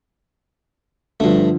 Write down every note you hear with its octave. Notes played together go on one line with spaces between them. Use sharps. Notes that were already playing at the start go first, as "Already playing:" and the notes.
G2 D3 F3 A3